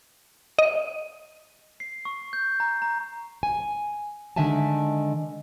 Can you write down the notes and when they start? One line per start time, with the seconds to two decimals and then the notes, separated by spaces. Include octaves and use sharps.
0.59 D#5
1.80 C7
2.05 C#6
2.33 G6
2.60 A#5
2.82 A#5
3.43 G#5
4.36 D3 D#3 G#3 E5 G#5 A5